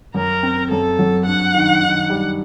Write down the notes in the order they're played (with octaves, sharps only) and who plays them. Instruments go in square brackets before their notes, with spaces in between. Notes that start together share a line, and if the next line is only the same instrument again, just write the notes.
[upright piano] F#2 [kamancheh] A#4
[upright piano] C4
[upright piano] F#2 [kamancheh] A4
[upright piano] F#3
[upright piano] G2 [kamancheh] F#5
[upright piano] D#3
D#3
G3